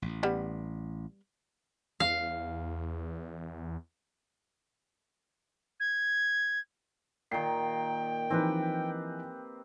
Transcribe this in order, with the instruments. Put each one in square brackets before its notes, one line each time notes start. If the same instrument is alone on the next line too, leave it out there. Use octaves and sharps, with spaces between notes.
[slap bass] A1
[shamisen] G3 B3
[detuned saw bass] E2 [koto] F5
[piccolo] G#6
[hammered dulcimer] A#2 D#3 [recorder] G5 [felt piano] C7
[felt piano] E3 F3 D#4 [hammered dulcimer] C4 G4 B4